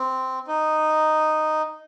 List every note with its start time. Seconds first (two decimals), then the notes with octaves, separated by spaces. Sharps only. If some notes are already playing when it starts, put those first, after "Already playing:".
Already playing: C4
0.48 D#4